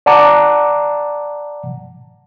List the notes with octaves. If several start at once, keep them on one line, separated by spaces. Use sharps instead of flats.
D5 F#5 A5 A#5 D6